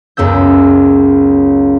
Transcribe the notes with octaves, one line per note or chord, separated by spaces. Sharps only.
C#2 F#2 B3 E6 G6